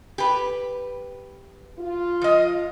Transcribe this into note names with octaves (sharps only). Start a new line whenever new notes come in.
G4 B4
F4
F3 D#5